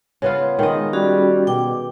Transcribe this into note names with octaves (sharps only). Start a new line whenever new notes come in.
C#3 B3 F4
D#3 G#3 D#5
G3 C#4 F#4 G#4
B2 G5 D6